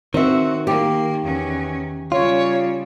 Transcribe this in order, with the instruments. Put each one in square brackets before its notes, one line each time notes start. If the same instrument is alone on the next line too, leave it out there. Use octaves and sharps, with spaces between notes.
[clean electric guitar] D#3 [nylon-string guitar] C4 E5 [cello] F#4
[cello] A#3 [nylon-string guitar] G4
[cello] E2 C#4
[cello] C#3 G3 [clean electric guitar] F4 [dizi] C#5